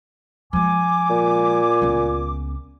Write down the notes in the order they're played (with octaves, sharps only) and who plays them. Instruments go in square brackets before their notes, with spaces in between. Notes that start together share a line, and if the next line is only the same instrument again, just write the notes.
[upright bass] F3 G#3 [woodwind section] G#5 D6
[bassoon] A#2
[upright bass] C#2 B3